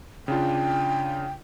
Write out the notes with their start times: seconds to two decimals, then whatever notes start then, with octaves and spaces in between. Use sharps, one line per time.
0.28 C#3 D4 F4 G5